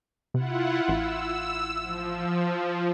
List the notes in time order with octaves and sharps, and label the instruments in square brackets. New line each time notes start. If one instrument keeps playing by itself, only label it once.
[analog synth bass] C3 [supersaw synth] E4 F4 F#5
[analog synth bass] A1 [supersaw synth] E6
[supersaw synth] F3